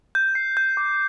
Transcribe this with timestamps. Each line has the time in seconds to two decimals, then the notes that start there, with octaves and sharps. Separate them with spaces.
0.15 G6
0.35 C7
0.57 G6
0.77 D6